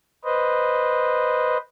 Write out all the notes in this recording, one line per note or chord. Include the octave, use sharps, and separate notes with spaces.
B4 C5 D#5